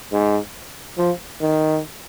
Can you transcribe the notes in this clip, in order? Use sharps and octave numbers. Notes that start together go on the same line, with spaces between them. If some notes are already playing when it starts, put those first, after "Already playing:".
G#2
F3
D#3